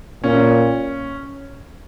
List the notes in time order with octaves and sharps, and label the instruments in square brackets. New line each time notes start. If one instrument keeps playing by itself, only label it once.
[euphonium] A#2 [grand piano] C#4